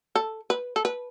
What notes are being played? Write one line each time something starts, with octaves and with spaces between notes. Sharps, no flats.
A4
B4
A4
B4